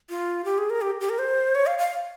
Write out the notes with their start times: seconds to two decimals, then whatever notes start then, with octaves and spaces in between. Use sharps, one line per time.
0.10 F4
0.45 G4
0.58 G#4
0.70 A#4
0.81 G4
1.00 G4
1.10 A#4
1.19 C5
1.55 C#5
1.66 F5
1.79 F5